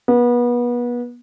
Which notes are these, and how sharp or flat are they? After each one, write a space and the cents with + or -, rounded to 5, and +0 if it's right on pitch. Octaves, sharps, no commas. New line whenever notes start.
B3 -30